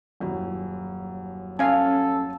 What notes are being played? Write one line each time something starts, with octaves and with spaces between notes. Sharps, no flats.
D#1 F#2 E4
C#4 A4 F5 G#5